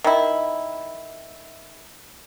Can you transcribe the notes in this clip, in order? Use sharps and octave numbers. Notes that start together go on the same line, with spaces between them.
D#3 E4